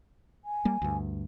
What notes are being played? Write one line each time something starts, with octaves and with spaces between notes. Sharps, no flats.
G#5
G3 A#3
D2 G2